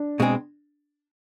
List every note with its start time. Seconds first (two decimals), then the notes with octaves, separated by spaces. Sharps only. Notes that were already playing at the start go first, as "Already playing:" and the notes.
Already playing: D4
0.20 B2 G#3 C4 G#4